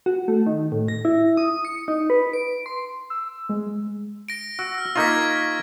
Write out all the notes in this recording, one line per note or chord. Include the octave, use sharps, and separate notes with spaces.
F#4
A3
D#3
A2
A#6
E4
D#6
C#7
D#4
B4
D7
C6
E6
G#3
A#6 D7
F#4 E6
E6 F6
A#3 D#4 F4 C#6 G#6 B6